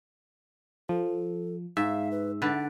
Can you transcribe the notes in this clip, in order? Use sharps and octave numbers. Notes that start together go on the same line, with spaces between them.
F3 A4
G#2 E5 F5
B4
D3 B4 D5 F#5